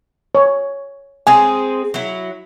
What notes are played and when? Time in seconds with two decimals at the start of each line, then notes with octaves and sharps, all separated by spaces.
0.35 C#5
1.27 G#3 C4 G#4 G#5
1.94 F#3 E4